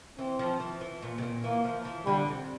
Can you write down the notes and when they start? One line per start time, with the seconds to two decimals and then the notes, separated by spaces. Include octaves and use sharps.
0.19 E3 C4
0.39 F3
0.60 E3
0.81 E3
1.02 A#2
1.18 C3
1.23 A#2
1.44 E3 A#3
1.64 F3
1.85 E3
2.06 D3 G3
2.28 C3